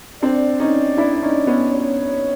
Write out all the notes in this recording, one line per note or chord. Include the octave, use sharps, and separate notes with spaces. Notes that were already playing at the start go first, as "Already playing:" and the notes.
C4 D4 D5
C#4 D#4
D4 E4
C#4 D#4
B3 C#4
C#5